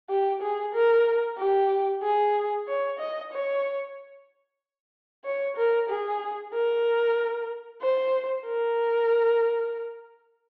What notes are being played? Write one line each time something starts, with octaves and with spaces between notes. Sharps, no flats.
G4
G#4
A#4
G4
G#4
C#5
D#5
C#5
C#5
A#4
G#4
A#4
C5
A#4